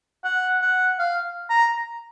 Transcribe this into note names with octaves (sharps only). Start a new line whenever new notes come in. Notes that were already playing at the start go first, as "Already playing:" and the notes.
F#5
F#5
F5
A#5